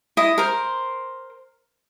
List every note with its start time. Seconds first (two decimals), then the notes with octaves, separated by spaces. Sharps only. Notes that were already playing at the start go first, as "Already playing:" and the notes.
0.17 E4 D#5
0.38 A#4 C5